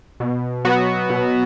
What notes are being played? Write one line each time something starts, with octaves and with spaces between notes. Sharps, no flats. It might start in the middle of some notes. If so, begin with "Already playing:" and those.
B2
F#3 B3 F#4
B2